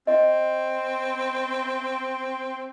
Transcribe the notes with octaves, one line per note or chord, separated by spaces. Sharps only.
C4 D#5